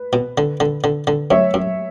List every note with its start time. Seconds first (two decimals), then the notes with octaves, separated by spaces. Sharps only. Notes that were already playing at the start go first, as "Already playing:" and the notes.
Already playing: B4
0.13 B2
0.38 D3
0.60 D3
0.84 D3
1.07 D3
1.31 F#2 C#5 E5
1.54 F#2